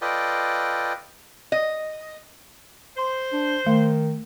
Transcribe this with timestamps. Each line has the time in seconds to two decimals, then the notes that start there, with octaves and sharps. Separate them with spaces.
0.01 F4 A4 B4 D5 D#5 G5
1.52 D#5
2.97 C5
3.33 D4
3.66 D#3 A3